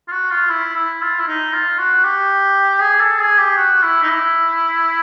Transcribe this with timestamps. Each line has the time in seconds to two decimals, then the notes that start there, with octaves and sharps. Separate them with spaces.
0.08 F4
0.12 F#4
0.31 F4
0.50 E4
0.76 E4
1.02 F4
1.20 E4
1.28 D#4
1.53 F4
1.78 F#4
2.04 G4
2.80 G#4
3.00 A4
3.19 G#4
3.38 G4
3.57 F#4
3.83 E4
4.02 D#4
4.08 E4